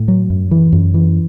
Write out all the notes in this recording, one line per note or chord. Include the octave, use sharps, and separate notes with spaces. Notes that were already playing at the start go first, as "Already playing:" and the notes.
Already playing: A2
F#3
F#2
E3
F#2
E3